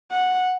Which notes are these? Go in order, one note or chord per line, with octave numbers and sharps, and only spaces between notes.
F#5